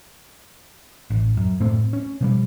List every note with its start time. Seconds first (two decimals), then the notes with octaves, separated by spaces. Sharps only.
1.10 A1
1.37 F#2
1.60 A2 A3 C4
1.93 C#4
2.21 B2 F3 G3